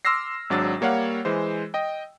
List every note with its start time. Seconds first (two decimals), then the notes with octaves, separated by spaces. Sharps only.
0.05 C6 D6 E6 F6 A#6 C7
0.50 G#1 G#2 F#3 D4 D5 A6
0.81 G3 A#3 C#5 F5 F#5
1.25 E3 G#3 C5
1.74 D#5 G5